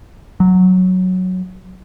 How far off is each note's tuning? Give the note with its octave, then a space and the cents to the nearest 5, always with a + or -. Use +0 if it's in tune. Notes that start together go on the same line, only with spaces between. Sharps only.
F#3 -5